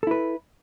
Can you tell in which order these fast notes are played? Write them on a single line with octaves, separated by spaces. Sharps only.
A4 E4 B4